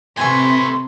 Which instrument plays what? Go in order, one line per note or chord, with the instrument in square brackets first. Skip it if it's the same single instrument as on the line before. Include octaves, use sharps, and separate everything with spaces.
[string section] C3 [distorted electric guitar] A3 B4 [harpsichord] G#5 C#6 [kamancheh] C6